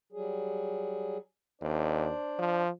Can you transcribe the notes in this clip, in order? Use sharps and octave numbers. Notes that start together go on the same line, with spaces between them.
F#3 G3 G#4
D#2 D4 C5 D5
F3